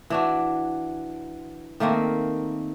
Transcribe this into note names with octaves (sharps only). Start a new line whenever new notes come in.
E3 D4 F#4
D#3 A3 A#3 C4